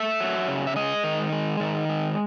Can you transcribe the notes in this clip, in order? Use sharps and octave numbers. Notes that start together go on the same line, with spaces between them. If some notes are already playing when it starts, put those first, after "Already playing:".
Already playing: A3 E5
F#3
C#3
E5
G#3 D#5
D#3
G#3
D#3
G#3